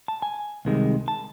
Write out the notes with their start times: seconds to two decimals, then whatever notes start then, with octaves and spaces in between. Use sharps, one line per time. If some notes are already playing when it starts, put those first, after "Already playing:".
0.08 A5
0.22 G#5
0.65 C2 C3 D#3 G#3
1.08 A5